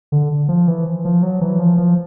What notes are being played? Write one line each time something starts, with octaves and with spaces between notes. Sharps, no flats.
D3
F3
E3
F3
F#3
E3
F3
F3